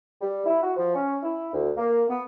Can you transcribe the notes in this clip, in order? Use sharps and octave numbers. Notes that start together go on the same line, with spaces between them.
G3
E4
F#4
F3
C#4
E4
D2
A#3
B3